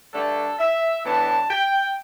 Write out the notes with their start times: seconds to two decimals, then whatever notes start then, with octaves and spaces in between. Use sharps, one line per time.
0.13 G2 D3 A3 D4 A4
0.59 E5
1.05 A2 E3 B3 D4 A5
1.50 G5